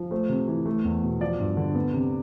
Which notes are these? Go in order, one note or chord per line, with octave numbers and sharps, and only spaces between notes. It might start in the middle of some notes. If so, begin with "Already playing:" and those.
Already playing: F3
A3 C5
C3
E3
A3
E2
B2
F3 D5
G2
D3
B3
C3